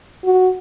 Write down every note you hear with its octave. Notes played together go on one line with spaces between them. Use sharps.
F#4